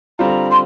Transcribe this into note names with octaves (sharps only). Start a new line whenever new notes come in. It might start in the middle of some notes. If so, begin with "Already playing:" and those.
D3 G3 C4 F4 A#5
C6